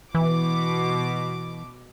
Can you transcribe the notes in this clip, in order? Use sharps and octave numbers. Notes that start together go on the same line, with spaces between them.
B2 E3 D6